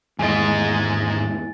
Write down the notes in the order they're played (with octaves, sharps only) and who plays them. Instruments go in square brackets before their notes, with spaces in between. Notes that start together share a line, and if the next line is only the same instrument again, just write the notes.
[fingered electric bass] E2 D#3 [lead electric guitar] G#2 D#5 [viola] G#3 [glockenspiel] G#5 A6